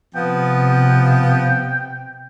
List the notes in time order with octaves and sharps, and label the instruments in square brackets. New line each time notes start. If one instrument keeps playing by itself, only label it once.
[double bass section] C3 [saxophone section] F3 B3 [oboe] G5